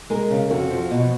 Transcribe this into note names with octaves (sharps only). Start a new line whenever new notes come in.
G#3 A#4
C#3
F2 F#4
F3
B2